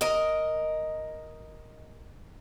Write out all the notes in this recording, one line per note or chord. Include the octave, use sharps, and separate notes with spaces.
A#4 D#5